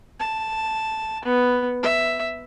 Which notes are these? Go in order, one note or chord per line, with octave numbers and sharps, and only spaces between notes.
A5
B3
E5